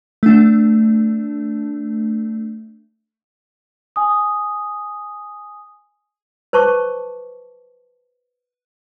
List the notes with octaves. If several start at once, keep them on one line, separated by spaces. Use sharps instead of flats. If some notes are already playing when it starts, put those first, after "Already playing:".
A3 D4
G#5 D#6
B4 C5 A5 C#6 D6